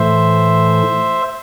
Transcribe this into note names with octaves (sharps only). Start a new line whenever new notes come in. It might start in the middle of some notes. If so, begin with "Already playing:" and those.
Already playing: A2 E3 A3 C5 E5